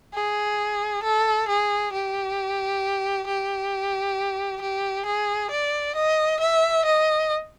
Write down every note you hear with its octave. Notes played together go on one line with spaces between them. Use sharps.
G#4
A4
G#4
G4
G4
G4
G#4
D5
D#5
E5
D#5